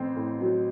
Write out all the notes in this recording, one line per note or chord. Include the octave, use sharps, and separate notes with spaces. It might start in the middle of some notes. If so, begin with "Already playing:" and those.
Already playing: A1 C4
A2
F#3